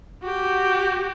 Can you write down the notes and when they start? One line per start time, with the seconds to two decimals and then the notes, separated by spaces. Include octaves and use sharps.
0.22 F#4 G4